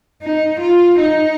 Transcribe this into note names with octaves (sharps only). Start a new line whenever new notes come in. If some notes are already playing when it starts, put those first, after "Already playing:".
D#4
F4
D#4